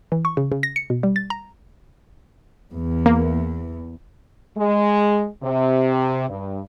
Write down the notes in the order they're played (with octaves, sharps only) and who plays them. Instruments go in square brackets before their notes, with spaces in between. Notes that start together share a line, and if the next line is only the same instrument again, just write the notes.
[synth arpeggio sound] E3
C#6
C#3
C#3
A#6
C#7
B2
G3
A6
A#5
[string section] E2
[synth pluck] A#3
[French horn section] G#3
C3
G2